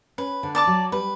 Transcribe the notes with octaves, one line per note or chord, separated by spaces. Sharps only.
C#4 B4
D3
D5 A5 D6
F#3
G3 B4